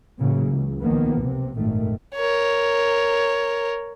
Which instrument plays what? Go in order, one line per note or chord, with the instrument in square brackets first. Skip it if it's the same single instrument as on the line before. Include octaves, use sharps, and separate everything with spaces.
[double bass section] A2 C#3 E3 F#3 A#3
C#2
B1 D#3 F3 A#3 B3
C3
G#1 F#2 A#2 D#3 A3
[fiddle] A#4 C#5